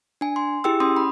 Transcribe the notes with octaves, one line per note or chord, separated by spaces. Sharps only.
D4 G#5
C6
E4 G4 G#4 G5 E6
C#4 C6 D#6
B5